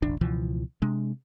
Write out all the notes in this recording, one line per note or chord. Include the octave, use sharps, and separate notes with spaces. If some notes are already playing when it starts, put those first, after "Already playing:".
E1 A1 D4
C#2 B2 E3 F3
C3 G#3 D4